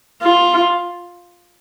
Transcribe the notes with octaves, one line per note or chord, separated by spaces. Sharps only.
F4